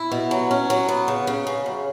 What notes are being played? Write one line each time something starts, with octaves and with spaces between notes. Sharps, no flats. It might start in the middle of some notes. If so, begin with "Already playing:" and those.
Already playing: E4
B2
F#3
C#4
F#3
B3
C#3
C#3
C#3
F#2